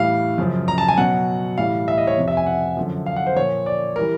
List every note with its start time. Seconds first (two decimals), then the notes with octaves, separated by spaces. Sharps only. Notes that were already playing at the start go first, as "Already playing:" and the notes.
Already playing: A2 E3 G3 F5
0.38 F#2 C#3 F3
0.68 A#5
0.78 A5
0.88 G#5
0.98 B2 F#3 F#5
1.58 A2 E3 G3 F5
1.88 E5
1.97 D#5
2.07 C#5
2.18 F2 C3 F3
2.28 E5
2.37 G#5
2.47 F#5
2.77 F#2 D3 F3
3.06 F5
3.16 F#5
3.27 C5
3.36 A#2 F3 C#5
3.66 D5
3.96 E3 G3 A#4